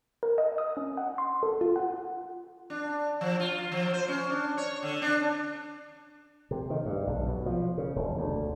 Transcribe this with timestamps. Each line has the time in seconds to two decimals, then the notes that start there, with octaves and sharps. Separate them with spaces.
0.23 A#4
0.38 D#5
0.58 D#6
0.77 C#4
0.97 F#5
1.18 C6
1.43 A4
1.61 F4
1.76 F#5
2.70 D4
3.21 F3
3.40 F4
3.72 F3
3.93 C5
4.08 C#4
4.30 D4
4.57 C#5
4.83 D3
5.02 D4
6.51 C3
6.70 D#3
6.86 G2
7.07 B1
7.26 B2
7.46 F3
7.78 C#3
7.96 E1
8.17 D2